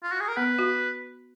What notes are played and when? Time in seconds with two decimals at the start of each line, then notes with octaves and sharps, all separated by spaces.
0.03 F4
0.12 F#4
0.20 G#4
0.28 A#4
0.37 B3 B4
0.59 F#4